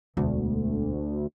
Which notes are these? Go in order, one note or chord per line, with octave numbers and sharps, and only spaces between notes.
E1 D2